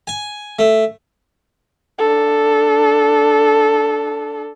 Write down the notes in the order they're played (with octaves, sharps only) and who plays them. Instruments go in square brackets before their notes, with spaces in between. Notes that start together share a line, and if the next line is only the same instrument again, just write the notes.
[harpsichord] G#5
A3
[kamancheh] D4 A4